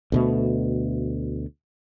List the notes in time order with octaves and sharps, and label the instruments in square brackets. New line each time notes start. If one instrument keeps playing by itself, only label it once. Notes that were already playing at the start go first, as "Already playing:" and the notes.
[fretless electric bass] D2 B2 A3